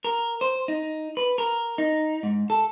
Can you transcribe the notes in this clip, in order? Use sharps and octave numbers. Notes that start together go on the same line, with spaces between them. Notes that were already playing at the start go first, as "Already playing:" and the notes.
A#4
C5
D#4
B4
A#4
D#4
G#2
A4